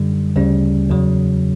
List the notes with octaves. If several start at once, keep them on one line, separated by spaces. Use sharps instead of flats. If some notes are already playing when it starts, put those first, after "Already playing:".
Already playing: F#2 D3 G3
D2 C#3 G3 C#4
E2 C#3 F#3